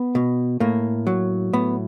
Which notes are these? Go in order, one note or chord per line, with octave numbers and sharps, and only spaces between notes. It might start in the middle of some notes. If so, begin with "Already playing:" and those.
Already playing: B3
B2
A2 A#3
F#3
A2 B3